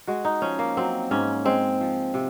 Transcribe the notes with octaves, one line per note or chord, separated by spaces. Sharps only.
G#3 F#4
D#4
F3 C#4
A#3
F#3 C4
G#2 C#4
G#3 C4
F3
C3